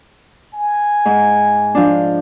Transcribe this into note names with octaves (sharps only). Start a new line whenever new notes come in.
G#5
G#2
F3 D4